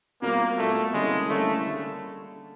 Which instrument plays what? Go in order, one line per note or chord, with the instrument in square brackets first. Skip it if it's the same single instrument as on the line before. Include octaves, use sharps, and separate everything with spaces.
[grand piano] B2 G3 C4 F4 A#4 [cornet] A#3
[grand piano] B2 G3 C4 F4 A#4 [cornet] A3
[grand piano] D3 G3 A#3 C#4 E4 [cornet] G#3
[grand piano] D3 G3 A#3 C#4 E4 [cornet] A3
[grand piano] D3 G3 A#3